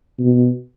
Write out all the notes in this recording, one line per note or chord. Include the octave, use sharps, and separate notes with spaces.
B2